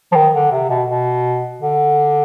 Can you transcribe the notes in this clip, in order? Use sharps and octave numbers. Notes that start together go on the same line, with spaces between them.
F3
D#3
D3
C3
B2
B2
D3